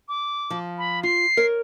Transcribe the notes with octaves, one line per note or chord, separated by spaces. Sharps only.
D6
F3
B5
F4 C7
A#4 C#5